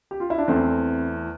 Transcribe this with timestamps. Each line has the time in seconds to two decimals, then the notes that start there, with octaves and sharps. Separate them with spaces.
0.11 G4
0.20 F4
0.30 E4
0.38 D4
0.48 E2 E3 A3 C4